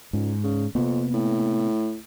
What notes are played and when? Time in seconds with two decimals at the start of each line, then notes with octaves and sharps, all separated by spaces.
0.13 C#2 G#2
0.44 C#3
0.75 F2 C3 A#3 B3
1.14 A2